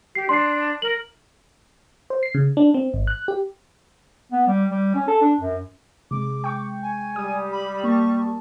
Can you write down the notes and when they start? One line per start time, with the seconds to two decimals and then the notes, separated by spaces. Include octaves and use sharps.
0.15 G4 C7
0.29 D4 C6 C7
0.82 A#4 F#7
2.10 C5
2.23 C7
2.34 C#3
2.57 D4
2.74 C4
2.94 G#1
3.07 F#6
3.28 G4
4.32 B3
4.47 G3
4.70 G3
4.95 C#4
5.07 A4
5.21 D4
5.41 F#2
6.11 C3 G#3 D6
6.44 G5 C#6
6.82 G#5
7.16 G3 D#6
7.52 B5
7.84 A#3 A5 C#6